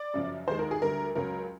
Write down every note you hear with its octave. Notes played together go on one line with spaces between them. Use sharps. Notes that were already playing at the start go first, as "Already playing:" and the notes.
Already playing: D5
F#2 C#3 F3
D#2 D#3 G#3 C5
A#4
G#4
D2 D3 G3 A#4
C#2 C#3 F#3 A#4